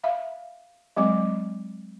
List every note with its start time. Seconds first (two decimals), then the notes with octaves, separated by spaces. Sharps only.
0.04 E5 F5
0.96 F#3 G#3 C4 D6